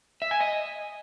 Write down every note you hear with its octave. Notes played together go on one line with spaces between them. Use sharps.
E5
G#5
D#5